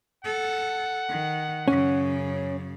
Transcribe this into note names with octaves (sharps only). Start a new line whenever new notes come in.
A4 F#5
D#3
F#2 C#3 C#4